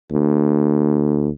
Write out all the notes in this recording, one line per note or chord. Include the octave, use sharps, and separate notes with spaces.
D2